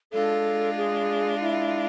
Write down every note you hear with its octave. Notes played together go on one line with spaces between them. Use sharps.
G#3 D4 F4 A4
G#4
E4